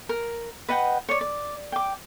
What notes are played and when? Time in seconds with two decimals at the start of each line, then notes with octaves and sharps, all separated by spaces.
0.09 A#4
0.68 B4 D#5 F#5 G5
1.09 C#5 D5
1.21 D5
1.72 G5 D6